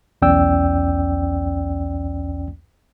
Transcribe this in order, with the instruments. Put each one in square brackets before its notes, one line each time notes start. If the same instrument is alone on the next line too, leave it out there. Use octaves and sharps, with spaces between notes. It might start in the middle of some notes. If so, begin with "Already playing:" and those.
[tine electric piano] B1 E2 C#4 D5 G5 E6